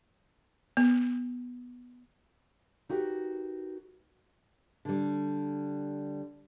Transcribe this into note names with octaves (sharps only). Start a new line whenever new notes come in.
B3
D#4 F#4 G4 A#4 B4
D3 G3